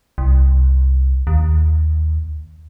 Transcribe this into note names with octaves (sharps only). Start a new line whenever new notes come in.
C2
D#2